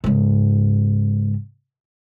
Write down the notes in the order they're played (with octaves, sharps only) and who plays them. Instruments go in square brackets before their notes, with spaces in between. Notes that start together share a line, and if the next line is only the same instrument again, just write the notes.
[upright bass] G#2 C#3